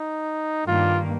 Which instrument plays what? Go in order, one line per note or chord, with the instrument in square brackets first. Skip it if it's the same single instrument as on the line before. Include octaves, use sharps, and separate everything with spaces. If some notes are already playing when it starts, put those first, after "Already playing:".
Already playing: [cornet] D#4
[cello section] G2 D#3 A#3 [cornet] F4